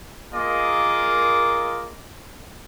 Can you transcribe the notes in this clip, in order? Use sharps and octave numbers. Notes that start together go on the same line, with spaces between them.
A#3 F4 G#4 A#4 D#5 D6